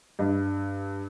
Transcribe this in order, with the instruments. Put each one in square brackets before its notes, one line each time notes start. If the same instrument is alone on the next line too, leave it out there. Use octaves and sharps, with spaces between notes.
[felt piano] G2